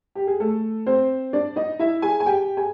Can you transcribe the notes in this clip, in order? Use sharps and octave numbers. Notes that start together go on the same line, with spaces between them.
G4
G#4
A3 A4
C4 C5
D4 D5
D#4 D#5
E4 E5
G#4 G#5
G#5
G4 G5
G#4 G#5